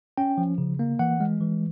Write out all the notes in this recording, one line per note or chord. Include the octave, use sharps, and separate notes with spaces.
C#4 G5
F3
C#3
A#3
E3 F#5
G#3
E3